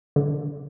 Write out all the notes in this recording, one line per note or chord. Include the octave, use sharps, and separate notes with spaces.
D3